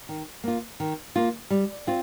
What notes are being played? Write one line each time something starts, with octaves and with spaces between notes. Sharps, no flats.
D#3
A#3 F4
D#3
A#3 F4
G3
C4 F4